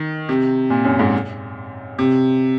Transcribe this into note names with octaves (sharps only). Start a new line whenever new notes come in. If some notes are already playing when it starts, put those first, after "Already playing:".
Already playing: D#3
C3
A#2
F#2
G#2
C3